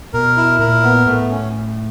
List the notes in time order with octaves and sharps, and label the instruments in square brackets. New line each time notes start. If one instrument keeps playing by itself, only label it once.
[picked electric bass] B2 [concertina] A#4
[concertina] E4
[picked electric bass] A#2 [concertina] A#4
[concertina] B3
[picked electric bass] A2 [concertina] A3
[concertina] C#4